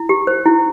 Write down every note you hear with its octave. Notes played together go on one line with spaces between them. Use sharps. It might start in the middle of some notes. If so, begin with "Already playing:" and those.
Already playing: E4
G4
C5
E4